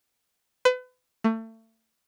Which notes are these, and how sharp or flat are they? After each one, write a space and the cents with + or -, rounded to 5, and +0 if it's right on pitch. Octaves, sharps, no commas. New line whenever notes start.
B4 +35
A3 +30